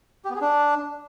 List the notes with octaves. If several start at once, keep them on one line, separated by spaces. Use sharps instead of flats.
G4
B3
G#4
D4